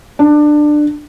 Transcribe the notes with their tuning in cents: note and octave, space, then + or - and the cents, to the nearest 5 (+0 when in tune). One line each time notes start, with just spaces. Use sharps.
D4 +20